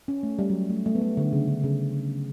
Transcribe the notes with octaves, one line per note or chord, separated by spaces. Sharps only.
C#4
A3
G3
F#3
G3
A3
A3
B3
A3
D3
C#3
D3
C#3